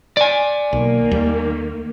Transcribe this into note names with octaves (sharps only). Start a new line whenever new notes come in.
D5 G#5
B1 D#3 A#3
D#2 G3